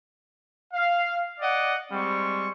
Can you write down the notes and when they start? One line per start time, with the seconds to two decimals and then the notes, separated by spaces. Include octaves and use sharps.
0.74 F5
1.40 D5 D#5 F#5
1.92 G3 G#3 C4 C#6